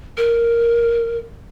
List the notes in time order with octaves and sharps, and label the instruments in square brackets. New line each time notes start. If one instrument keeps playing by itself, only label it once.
[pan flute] A#4